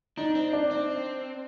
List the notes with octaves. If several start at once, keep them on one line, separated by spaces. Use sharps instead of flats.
D4 D#4
C4
D4
C4